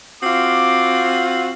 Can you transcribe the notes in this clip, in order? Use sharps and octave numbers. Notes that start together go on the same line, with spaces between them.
C4 F4 F#4 D6